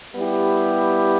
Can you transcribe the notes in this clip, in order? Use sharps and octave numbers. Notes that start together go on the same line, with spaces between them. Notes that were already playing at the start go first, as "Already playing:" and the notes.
G3 B3 E4 G4